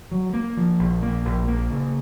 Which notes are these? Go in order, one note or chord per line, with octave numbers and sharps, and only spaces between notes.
F#3
A#3
F3
A#1
A#3
A#1
A#3
C#3